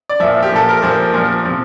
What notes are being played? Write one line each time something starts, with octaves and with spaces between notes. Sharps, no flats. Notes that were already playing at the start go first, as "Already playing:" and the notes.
D5
A#2 F3 E5
G4
A#2 F3 A4
A#4
A#2 F3 C5
A#2 F3
C3 F3